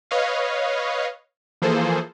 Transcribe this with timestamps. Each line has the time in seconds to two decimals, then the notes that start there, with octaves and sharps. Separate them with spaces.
0.11 B4 C#5 D#5 F5
1.62 E3 F3 A#3 G#4 A4 C5